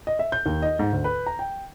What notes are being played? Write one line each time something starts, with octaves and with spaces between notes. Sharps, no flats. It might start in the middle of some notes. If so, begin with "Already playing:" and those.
D#5
E5
G6
D#2
D#5
G#2
D2
B4
A#5
G5